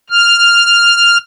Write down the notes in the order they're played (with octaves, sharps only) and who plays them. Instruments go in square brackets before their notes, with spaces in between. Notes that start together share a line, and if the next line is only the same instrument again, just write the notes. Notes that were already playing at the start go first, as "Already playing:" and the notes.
[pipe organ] F6